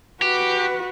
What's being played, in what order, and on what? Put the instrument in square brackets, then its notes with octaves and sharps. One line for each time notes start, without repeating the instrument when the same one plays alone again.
[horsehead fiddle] F#4 B4 [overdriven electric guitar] G4